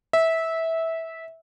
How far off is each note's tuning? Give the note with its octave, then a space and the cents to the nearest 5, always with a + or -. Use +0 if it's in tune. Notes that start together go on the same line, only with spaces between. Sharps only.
E5 -15